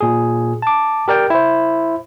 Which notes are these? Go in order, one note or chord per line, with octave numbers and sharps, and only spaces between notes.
A#2 G#4
A5 D6
G4 A#4 D5 G5
E4 C5